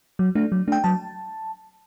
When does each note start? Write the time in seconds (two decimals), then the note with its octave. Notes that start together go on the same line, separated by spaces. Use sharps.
0.19 F#3
0.35 A3 D4
0.52 F#3
0.68 A3 D4 G5
0.84 F#3 A5